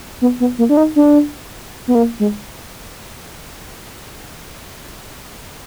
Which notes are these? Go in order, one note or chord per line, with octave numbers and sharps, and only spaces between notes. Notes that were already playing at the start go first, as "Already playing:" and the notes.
B3
B3
A#3
D4
D#4
D4
B3
A#3
G#3